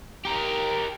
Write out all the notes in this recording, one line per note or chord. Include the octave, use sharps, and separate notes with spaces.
G4 A#4